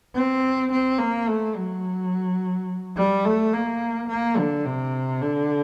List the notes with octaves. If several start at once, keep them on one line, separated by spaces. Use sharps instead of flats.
C4
C4
A#3
A3
F#3
G3
A3
A#3
A#3
D3
C3
D3